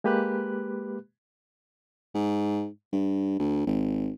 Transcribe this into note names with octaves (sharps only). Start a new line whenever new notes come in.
G#3 A#3 G4 B4 B5 F#6
G#2
G2
D2
G#1